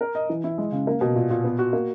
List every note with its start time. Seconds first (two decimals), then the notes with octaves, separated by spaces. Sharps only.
0.01 A#4
0.15 D#5
0.29 E3
0.44 E4
0.58 G#3
0.72 C#3
0.87 A#3
1.01 B2
1.16 A#2
1.30 A#2
1.44 B3
1.59 F#4
1.73 A#3